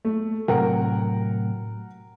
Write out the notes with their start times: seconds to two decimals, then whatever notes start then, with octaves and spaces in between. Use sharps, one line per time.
0.05 A3
0.48 A2 C3 F#3 A#4 F#5 G5